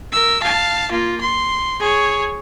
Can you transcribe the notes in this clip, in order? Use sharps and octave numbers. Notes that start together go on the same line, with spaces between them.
A#4 E6
F5 A5
A#3 F4
C6
G#4 C#5